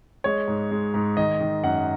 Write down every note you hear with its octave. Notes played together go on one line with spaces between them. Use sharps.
G#3 C#5
G#2
G#3
G#2
D#3 D#5
D#3
F#2 F#5